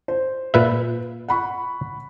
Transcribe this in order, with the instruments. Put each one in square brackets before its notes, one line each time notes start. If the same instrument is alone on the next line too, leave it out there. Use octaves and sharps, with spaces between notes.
[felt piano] C5
[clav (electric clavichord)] A#2 B4 E5
[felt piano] F#5 B5 C#6